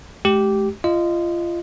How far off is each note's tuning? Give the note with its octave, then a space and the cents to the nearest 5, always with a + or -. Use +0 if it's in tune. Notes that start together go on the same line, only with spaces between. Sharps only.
G#3 +45 G4 -10
F4 -25 D#5 -15